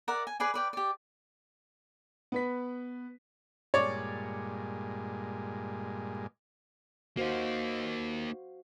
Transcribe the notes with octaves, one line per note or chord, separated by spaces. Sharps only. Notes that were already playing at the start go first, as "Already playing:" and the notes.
A#4 D5 E5 F#5
G#5
G#4 B4 D5 G#5
B4 D5 G5
G4 D5
B3 B4 B6
G2 A#2 G#3 C#5 D5
A#3 D#4 F#4 C5 F5